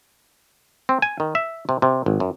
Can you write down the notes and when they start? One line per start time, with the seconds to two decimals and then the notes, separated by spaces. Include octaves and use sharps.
0.89 C4
1.02 G#5
1.20 D#3
1.35 E5
1.69 C3
1.82 C3
2.06 G#1
2.20 F#2